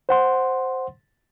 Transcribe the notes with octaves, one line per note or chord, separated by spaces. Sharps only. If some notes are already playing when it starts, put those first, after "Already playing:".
C5 F#5 C6